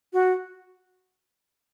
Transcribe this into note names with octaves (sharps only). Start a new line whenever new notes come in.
F#4